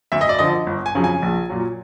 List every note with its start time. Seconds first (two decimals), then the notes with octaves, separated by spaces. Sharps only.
0.12 D2 E5
0.21 D#5
0.29 D5
0.39 D3 F3 D#5
0.67 G1
0.86 G#5
0.95 F2 C#3 F#3
1.04 G#5
1.22 A#1
1.49 A#2 F#3